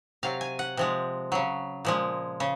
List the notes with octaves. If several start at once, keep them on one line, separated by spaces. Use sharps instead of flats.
C3 F#3 F5
G#5
F#5
C3 F3 G#3
C#3 F#3
A#2 F3 G#3
C#3